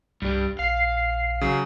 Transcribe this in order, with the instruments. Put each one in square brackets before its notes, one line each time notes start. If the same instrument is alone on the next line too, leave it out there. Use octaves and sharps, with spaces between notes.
[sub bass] C2 [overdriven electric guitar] G2 G3
[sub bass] A#1 [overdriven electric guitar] F5 [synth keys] C7
[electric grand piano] C#3 F#3